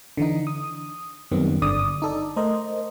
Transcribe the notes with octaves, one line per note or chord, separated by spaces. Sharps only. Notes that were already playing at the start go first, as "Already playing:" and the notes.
D3 E3 D#4
D#6
F#2 D#3 G3 B3 C4
G1 D3 D5 D#6
D#4 A4 D5
A3 A#4 C5 D#5